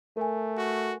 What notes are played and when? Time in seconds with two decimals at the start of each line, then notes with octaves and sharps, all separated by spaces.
0.17 A3 A#4 G#5
0.57 F#4